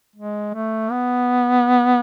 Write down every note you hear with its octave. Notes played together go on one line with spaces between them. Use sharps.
G#3
A3
B3